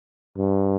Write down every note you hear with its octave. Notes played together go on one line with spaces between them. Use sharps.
G2